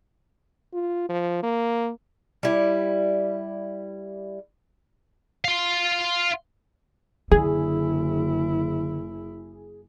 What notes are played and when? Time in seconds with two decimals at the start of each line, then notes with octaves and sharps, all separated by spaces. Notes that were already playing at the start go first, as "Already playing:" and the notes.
0.73 F4
1.09 F3
1.43 A#3
2.43 G3 E4
5.45 F5 C6
7.31 F#1 D3 E4 G#4